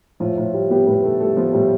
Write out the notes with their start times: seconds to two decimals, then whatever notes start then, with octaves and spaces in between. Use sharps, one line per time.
0.20 A2 F3 F4
0.38 A2
0.54 G3
0.70 G3 B3 G4
0.87 A2 B3 B4
1.03 A2 A3 A4
1.20 G3 A3 A4
1.37 F3 B3 F4
1.53 A2 G3 G4